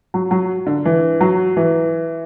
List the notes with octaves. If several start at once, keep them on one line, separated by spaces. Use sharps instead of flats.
F#3
F#3
D3
E3
F#3
E3